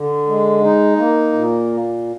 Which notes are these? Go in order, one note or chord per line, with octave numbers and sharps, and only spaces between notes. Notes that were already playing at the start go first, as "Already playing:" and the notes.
Already playing: D3
G#3
D#4
A#3
A#2